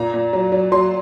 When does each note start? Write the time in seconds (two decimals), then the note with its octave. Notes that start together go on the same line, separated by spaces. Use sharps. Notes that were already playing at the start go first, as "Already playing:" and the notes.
Already playing: A#2 A#5
0.14 A#2
0.33 F#3
0.52 F#3
0.72 F#3 C6